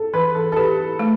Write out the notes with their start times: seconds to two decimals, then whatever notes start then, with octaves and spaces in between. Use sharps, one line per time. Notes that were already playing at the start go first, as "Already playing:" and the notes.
Already playing: A4
0.14 E3 B4
0.35 A4
0.52 A4
0.57 G4 B4
0.99 A3